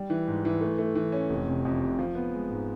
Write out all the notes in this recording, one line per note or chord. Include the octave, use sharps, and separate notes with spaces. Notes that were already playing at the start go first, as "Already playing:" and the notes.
Already playing: G3
E3
G#2
E3
A3
A3
E3
C#4
F1
C3
F2
F1
F3
B3
G#3
G#2